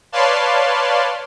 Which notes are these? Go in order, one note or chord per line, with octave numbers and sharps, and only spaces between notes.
B4 C#5 D5 F5 A5 C6